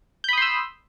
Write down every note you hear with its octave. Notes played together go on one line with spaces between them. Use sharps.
B5 C6 D#6 E6 G6